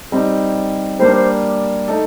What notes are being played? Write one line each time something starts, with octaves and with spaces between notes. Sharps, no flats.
G3 C4 D#4
G3 A#3 D4 C5
C5
A3 D#4 A4